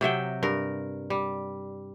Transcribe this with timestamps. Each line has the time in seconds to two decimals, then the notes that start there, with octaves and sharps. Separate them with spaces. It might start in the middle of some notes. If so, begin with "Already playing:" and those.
0.01 C3 F#3 E5 G5
0.43 G2 A#4
1.10 G3